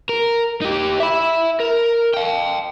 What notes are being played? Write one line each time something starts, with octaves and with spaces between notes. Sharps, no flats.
A#4
D#4 G4
E5 B5
A#4
F5 G5